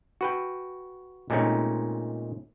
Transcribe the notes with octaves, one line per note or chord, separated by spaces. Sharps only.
F#4 B4 G5
A#2 G#3 A3 C4 C#4 D#4